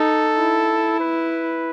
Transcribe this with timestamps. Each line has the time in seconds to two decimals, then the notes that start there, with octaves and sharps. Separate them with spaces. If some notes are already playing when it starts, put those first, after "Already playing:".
Already playing: D#4 A4
0.37 E4
1.00 B4